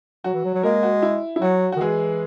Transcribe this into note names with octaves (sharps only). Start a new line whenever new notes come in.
F#3 F#4
E3
F#3
F#3
G#3 A#3 A#4
F#4
E4
E4
F#3 F#4
D#3 F#4
E3 G#3 G#4